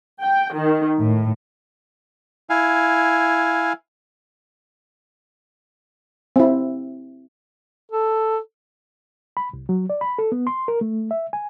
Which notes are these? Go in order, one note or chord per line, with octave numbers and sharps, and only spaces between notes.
G5
D#3
A2
E4 F5 G#5
C4 E4
A4
B5
C2
F#3
D5
B5
A4
B3
C6
A#4
A3
E5
G#5